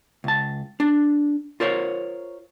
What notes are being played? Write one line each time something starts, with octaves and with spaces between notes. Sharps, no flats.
C#2 A5
D4
F4 A#4 C5 C#5